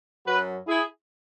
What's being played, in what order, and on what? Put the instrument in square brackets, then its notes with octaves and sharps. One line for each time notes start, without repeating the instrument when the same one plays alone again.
[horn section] F#2 F#3 F#4 B4
E4 G#4